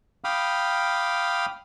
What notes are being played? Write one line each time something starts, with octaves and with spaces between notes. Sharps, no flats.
F5 G5 B5 D6 D#6 F6